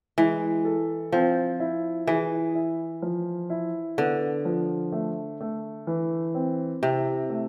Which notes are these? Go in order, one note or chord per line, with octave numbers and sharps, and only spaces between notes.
E3 G#3
A4
F3 C4
E4
E3 G#4
E4
F3
E4
D3 B3
F3
A3
A3
E3
C4
C3 E4
A3